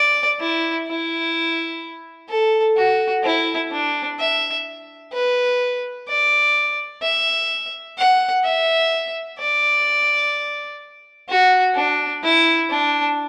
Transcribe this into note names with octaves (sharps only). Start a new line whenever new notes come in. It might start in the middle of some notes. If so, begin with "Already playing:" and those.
Already playing: D5
E4
E4
A4
F#4
E4
D4
E5
B4
D5
E5
F#5
E5
D5
F#4
D4
E4
D4